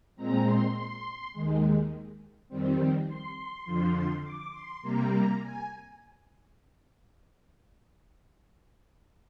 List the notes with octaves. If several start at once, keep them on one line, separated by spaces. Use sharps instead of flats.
A#2 G#3 C4 A#5
C6
C6
D#2 D#3 G#3
F2 D#3 G3 C4
C6
F2 D3 F3
D6
C6
C3 G3 A#3 A#5
G#5